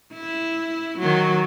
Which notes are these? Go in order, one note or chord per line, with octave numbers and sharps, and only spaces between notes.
E4
D#3 F#3